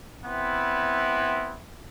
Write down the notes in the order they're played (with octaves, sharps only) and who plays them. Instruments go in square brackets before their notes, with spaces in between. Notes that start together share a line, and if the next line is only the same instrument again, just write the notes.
[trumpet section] B3 C4 E4